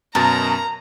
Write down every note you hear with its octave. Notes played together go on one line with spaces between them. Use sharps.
F#2 B2 A#4 A5 A#5